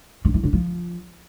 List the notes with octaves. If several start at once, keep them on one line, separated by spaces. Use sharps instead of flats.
D3
E3
D3
F3